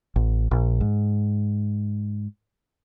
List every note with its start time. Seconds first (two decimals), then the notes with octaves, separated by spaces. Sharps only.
0.16 A1
0.51 A#1
0.81 G#2